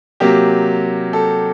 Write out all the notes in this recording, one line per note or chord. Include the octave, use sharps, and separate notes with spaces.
C3 F#3 A#3 G4
A4